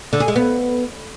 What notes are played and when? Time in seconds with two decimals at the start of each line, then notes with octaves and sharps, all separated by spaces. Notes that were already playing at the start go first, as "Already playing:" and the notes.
0.13 D3
0.20 G#4
0.28 G#3
0.36 B3